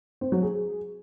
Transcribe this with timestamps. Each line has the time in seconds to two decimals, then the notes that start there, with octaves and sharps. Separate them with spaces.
0.21 C4
0.32 F#3
0.43 G#4